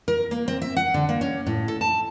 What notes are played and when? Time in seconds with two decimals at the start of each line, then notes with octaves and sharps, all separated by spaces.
0.08 A#4
0.31 A#3
0.48 C4
0.62 E5
0.76 F#5
0.94 D3
1.09 A#3
1.21 C#4
1.47 A2
1.68 A4
1.81 A5